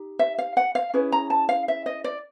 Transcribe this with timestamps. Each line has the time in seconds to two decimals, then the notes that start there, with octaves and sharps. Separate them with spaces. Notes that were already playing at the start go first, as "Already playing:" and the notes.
Already playing: D#4 G4
0.19 E5
0.38 F5
0.57 F#5
0.75 F5
0.94 C#4 E4 G#4 B4
1.12 A#5
1.30 A5
1.49 F5
1.68 E5
1.86 D#5
2.04 D5